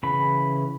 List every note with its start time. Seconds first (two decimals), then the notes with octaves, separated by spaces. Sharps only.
0.03 C#3 E3 B5